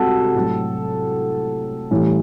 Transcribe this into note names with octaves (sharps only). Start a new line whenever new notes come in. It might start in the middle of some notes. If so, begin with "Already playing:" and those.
Already playing: C3 F#4 A4 F#5 A5
A2 F#3
A2 E3 G3